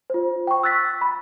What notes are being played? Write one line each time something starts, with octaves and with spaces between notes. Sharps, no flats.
F4 C5
G5 C#6
E6 F#6 A6 B6
B5